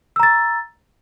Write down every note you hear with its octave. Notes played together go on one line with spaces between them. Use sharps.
A#5 E6 A6